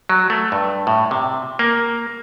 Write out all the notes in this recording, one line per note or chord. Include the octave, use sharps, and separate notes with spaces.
F#3
A3
G2
A2
C3
A#3